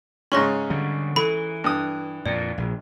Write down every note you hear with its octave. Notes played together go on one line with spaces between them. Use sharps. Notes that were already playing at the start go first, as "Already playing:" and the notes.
G#2 C#3 C#4 C6 C#6 A#6
D3 G3
E3 A4 B5
G2 D#6
F2 A#2 D5
A#1